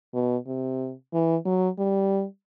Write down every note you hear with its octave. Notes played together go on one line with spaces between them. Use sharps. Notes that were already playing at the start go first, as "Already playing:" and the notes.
B2
C3
E3
F#3
G3